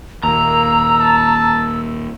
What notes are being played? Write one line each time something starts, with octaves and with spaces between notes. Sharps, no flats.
D#2 A#2 A#3 A#5 E6
A5